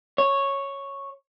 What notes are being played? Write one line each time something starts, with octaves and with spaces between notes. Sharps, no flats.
C#5